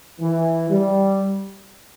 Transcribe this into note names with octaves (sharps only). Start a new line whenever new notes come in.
E3
G3